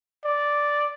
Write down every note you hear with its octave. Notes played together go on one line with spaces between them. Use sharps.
D5